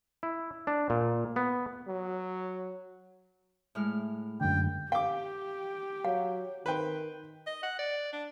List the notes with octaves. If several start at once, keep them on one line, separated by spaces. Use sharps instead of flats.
E4
D4
A#2
B3
F#3
A2 G#3 F6
F#2 D3 G5
G4 F5 G5 D6
F#3 F5
D#3 B4 C5 G5
D#5
F#5
D5
D4